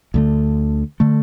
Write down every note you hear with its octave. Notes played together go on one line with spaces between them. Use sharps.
D2 D3 A3
D3 A3